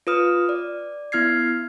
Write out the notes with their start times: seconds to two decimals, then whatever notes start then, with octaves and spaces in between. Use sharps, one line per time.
0.07 F4 B4 D#6 F6
0.49 D5
1.12 B3 E4 F6 G#6 C7